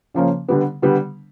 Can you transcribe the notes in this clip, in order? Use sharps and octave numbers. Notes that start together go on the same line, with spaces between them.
C#3 F3 A#3 C#4
D3 G3 B3
D3 G3 B3